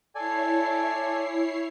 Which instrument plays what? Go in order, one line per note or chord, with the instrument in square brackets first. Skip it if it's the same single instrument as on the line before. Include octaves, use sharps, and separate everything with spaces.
[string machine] E4 C#5 C7 [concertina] A4 D5 G#5